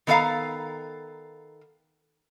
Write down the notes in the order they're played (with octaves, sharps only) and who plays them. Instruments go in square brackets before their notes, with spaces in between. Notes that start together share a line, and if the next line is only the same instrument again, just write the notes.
[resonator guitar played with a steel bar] D#3 B3 A4 C#5 F5 A#5